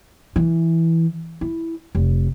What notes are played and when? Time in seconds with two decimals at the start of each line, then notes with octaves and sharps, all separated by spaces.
0.36 E3
1.41 E4
1.95 F1